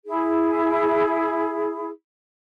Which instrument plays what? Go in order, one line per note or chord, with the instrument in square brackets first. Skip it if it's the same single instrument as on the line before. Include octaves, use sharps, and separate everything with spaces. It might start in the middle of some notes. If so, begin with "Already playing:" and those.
[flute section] E4 G#4